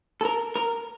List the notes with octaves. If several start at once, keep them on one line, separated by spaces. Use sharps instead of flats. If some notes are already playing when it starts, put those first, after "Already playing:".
A4
A#4
A#4